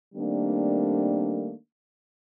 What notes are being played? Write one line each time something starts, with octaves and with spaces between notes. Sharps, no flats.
D#3 G3 A3 A#3 C4 D4